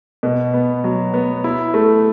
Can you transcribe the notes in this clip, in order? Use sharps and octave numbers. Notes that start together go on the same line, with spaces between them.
B2
B3
F#3
B3
E4
A3